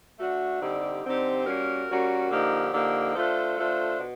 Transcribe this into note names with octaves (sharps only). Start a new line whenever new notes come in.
A3 D4 F#4
D3 G3 C4 D#4 G4
D3 G3 C4 D#4 G4
G3 A#3 C#4 F#4 A#4
G3 A#3 C#4 F#4 A#4
D3 F3 A#3 D#4 G4
D3 F3 A#3 D#4 G4
A3 D4 F4 A4 C5
A3 D4 F4 A4 C5
B2